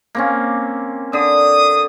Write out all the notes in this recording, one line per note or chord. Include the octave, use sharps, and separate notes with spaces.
A#3 C4 C#4
D3 D#6